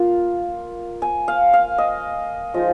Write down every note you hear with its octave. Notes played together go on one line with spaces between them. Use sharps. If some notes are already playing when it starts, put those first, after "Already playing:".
Already playing: A#3 F4 F5
G#5
F5
F5
D#5
F3 G#3 D#4 D#5